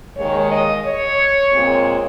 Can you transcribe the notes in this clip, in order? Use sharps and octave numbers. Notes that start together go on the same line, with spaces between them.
D#2 D#3 G#3 C#5
D#5
C#5
A#2 G#3 C4